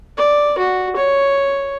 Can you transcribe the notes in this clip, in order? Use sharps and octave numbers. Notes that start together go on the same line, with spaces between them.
D5
F#4
C#5